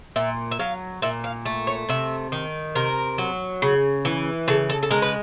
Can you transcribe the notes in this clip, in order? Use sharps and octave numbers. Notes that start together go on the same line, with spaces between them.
A#2 E5
E5
F#3 F5
A#2 E5
F5
A3
C#5
C3 E5
D#3
C3 A#4
F#3
C#3
E3
C#3 A4
A4
A4
G#3 A#4
B4